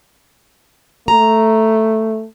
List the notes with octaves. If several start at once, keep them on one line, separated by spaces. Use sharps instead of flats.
A3 A#5